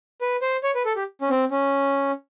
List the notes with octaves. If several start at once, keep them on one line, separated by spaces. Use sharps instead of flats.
B4
C5
C#5
B4
A4
G4
C#4
C4
C#4